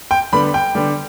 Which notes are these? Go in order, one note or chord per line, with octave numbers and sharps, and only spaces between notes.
G5
D3 G3 B3 B5
G5
D3 G3 B3